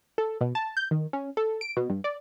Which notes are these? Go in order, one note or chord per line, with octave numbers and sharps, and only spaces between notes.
A4
B2
A5
G6
D#3
C#4
A4
D7
B2
G2
D5